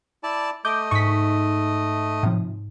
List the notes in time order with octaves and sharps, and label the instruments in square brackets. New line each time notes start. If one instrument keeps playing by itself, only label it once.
[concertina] E4 D5 A5
[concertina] A3 D#5 [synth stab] D6 G6
[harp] G#2 [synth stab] C#6 B6
[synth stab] A2 C3 F3